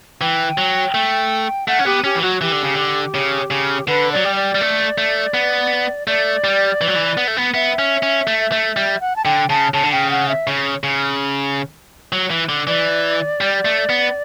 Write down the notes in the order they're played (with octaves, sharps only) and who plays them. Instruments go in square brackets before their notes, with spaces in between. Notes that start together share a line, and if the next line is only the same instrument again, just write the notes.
[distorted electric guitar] E3 [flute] G5
[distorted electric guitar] F#3
A3
[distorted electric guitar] A3 [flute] F#5
[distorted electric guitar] C#4
[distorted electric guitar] B3 [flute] G4
[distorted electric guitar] C#4 [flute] G4
[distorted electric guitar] E3
[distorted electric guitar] F#3 [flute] F#4
[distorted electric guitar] E3 [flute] G4
[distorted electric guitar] D3
C#3
D3
C#3
C#3
[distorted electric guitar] D3 [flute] B4
[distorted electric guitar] F#3 [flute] D5
[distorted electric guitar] G3
[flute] D5
[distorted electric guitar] G3
A3
A3
B3
[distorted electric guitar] A3 [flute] D5
[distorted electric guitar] G3
E3
F#3
E3
B3
A3
B3
[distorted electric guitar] B3 [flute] E5
[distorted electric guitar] C#4
C#4
A3
A3
G3
[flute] F#5
A5
[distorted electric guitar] D3 [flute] G5
[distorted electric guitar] C#3 [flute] A5
[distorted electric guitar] C#3 [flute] A5
[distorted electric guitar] D3
[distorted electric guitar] C#3 [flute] G5
[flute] F#5
E5
[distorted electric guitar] C#3
C#3
F#3
E3
D3
[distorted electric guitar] E3 [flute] D5
[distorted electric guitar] G3
A3
B3